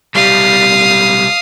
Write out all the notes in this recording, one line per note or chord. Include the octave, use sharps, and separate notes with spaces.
B1 G3 F5 D#6